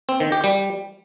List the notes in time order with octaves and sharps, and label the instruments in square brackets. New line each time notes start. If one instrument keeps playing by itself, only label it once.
[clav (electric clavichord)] C4
D#3
G4
G3